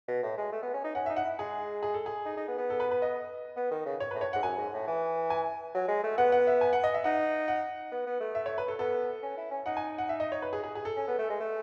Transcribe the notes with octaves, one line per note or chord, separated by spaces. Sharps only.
B2
A2
G#3
A3
B3
C#4
D#4
C#4 F#5
D#4 E5
F#5
E4
G#3 G#4
G#4
A4
G#4
D#4
D#4
B3
B3
A4
B4
B4
D#5
B3
D#3
C#3
C#5
A2 B4
C#5
G#2 F#5
F#2 G#5
G#2
A2
E3
G#5
F#3
G#3
A3
B3 F#5
F#5
E5
G#5
F#5
D#5
E5
D#4 F#5
F#5
B3
B3
A3
E5
C#5
B4
A4
B3 A4
C#4
E4
C#4
D#4 F#5
G#5
F#5
E5
D#5
C#5
B4
G#4
G#4
G#4
A4
C#4
B3
A3
G#3
A3